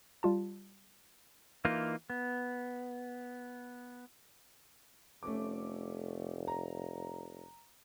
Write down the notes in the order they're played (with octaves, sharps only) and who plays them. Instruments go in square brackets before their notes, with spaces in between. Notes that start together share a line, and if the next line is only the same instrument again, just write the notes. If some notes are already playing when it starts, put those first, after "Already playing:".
[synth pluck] G3 F4 A5
[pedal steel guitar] E3 A#3 D#4 F4
B3
[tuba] F1 [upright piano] A3 C#4 D6
[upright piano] A#5